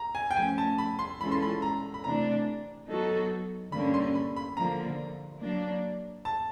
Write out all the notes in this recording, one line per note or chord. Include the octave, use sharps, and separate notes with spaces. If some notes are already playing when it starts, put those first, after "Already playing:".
Already playing: A#5
G#5
G5
F3 A3 C#4 G#5
A5
B5
C6
E3 G#3 C#4 F4 A4 B5
C6
B5
A#5
B5
C3 E3 A3 D4 A#5
F#3 B3 D#4 F#4 A4
G2 D3 G3 A#3 C#4 B5
C6
B5
B5
D3 F3 A#3 A#5
F#3 A#3 D4
A5